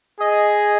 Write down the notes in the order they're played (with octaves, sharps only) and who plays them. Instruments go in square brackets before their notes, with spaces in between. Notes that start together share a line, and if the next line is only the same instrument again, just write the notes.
[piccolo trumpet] G#4 [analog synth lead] D#5